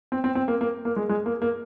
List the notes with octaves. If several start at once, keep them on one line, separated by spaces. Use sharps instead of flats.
C4
C4
C4
A#3
A#3
A#3
G#3
G#3
A#3
A#3